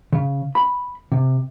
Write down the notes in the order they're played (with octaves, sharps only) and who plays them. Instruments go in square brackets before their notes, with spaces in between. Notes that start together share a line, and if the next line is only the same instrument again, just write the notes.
[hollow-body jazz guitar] C#3
B5
C3